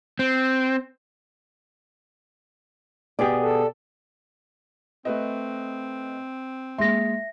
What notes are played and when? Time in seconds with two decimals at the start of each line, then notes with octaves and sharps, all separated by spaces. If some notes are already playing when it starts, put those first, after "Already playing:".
0.19 C4
3.19 B2 B3 G4 G#4 D5
3.41 A4
5.05 A3 C4 B4 D#5
6.78 G#3 A#3 G#4 E5 C6 A#6